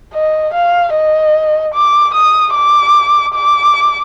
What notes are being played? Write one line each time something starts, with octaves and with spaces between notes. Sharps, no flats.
D#5
F5
D#5
D6
D#6
D6
D6